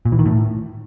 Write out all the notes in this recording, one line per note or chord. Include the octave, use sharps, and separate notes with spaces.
A#2
E3
D#3
A2